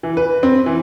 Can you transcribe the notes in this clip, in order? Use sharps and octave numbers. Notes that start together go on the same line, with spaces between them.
E3
B4
C4
E3